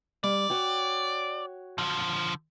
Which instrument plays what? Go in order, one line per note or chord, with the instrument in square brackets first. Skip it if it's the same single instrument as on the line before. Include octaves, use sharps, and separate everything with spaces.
[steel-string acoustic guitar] G3 [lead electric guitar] D5
[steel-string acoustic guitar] F#4 C#5 G5
[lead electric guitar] D3 F3